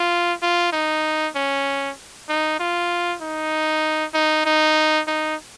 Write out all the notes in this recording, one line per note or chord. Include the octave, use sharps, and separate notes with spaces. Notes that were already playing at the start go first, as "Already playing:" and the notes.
Already playing: F4
F4
D#4
C#4
D#4
F4
D#4
D#4
D#4
D#4